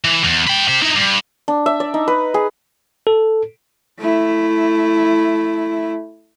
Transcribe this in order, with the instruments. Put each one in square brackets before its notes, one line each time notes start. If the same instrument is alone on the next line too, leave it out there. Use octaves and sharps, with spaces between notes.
[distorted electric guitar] E3
E2
B4 G5
G4 C5
D#4 E4
G2
[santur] D4
E5
D5
D#4
B4
G#4
[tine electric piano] A4
[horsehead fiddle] A3 E4